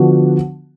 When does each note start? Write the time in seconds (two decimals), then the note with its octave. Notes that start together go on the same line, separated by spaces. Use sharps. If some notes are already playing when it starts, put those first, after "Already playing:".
Already playing: D3 F3 B3 D4 F#4